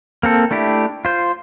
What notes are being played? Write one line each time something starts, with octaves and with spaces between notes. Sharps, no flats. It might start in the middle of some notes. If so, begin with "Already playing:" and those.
A#3 C4 A4
A3 D4 E4 G4
F4 C5